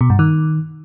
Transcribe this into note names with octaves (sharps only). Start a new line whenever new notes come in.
B2
G2
D#3